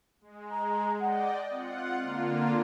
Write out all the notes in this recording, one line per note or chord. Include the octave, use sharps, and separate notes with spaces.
G#3
A#5
D5 D#5 F#5 G5
C4 F4 F#5
D3 A#3 F4